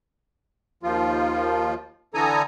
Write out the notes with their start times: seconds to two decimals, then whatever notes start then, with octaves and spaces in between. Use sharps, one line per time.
0.83 D#2 F3 F4
2.14 D3 E3 A4 G#5 A#5 D#6